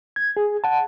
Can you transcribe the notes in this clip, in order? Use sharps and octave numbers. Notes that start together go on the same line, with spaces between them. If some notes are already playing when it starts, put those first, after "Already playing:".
G#6
G#4
F#5 A5